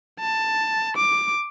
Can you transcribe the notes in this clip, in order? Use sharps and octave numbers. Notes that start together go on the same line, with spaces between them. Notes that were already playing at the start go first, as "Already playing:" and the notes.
A5
D6